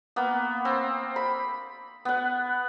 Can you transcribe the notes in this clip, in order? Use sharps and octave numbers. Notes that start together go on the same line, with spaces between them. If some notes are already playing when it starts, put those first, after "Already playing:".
A#3 B3
C4
B5
B3 F#5